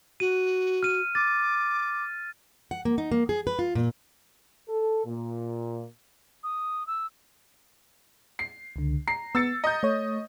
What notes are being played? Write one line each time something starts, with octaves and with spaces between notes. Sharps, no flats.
F#4 D#7
F6 D#7
D6 A6
F#5
A#3
D#4
A#3
G#4
B4
F4
A#2
A4
A#2
D#6
E6
C7
C#2 D3
A#5 C7
B3 E6 A6 C#7
D#5 A#5 G6
A3 C#5